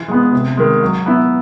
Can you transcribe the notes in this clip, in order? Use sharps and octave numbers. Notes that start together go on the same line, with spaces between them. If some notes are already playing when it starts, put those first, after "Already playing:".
Already playing: E3
G#3 B3
C3
D#3 G#3
F#3
B3 E4